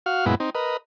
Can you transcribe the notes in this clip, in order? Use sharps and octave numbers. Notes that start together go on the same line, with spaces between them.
F#4 F5 F6
F#2 A#2 G#3 B3 E4
C4 D#4
A#4 B4 D#5